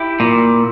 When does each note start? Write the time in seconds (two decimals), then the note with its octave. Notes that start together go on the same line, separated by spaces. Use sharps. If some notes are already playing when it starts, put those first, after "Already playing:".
Already playing: E4 G4
0.20 A#2